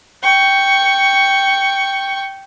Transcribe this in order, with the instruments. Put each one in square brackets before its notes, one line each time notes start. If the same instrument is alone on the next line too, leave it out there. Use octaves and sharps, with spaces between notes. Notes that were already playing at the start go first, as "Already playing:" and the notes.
[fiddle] G5 C#6